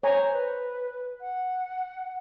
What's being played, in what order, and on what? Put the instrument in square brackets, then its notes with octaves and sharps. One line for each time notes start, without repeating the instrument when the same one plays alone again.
[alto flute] C5 [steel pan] C#5 G#5 A#5
[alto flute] B4
F#5